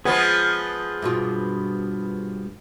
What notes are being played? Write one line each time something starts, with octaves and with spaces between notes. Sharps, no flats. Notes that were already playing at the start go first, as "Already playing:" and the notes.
F3 G#3 B3 G#4 B4 G#5
G2 B2 F4